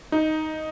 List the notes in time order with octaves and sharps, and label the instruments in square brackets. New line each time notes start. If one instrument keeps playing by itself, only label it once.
[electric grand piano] D#4